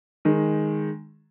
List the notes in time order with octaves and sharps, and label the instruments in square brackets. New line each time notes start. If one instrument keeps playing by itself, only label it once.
[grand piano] D#3 G#3